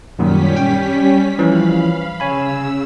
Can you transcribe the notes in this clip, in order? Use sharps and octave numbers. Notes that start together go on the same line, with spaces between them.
F#2 A#2 D#3 G3 C#4 B6
G5
E3 F3 C#4 F5 B5
C#3 C#5 G#5 B5 E6